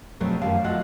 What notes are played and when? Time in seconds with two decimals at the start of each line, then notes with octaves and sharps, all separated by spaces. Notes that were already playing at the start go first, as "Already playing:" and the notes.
0.20 B2 F3 F#3 G#3 A3 C4
0.41 F#2 D#3 G3 F5 A5
0.64 F#3 A3 F4 D#5 F#5